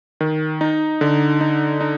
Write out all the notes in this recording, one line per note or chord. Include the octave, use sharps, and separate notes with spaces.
D#3
D#4
D3
D#4
D#4